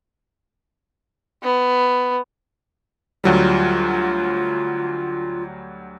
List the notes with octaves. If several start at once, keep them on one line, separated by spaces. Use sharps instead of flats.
B3
D2 F#3 G3 F4